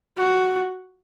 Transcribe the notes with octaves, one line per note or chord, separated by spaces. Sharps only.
F#4